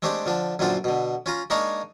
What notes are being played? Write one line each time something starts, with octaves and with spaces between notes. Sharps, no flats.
G#3 A3 C4 D4 G4
D3 F3 D4
F#2 A#2 D3 C4 D4 F4
B2 D3
C#4 F4 A#5
G#3 A#3 D4 D#4 C#5 F5